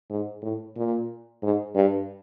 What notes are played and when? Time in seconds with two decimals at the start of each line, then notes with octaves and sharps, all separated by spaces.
0.10 G#2
0.42 A2
0.76 A#2
1.43 G#2
1.75 G2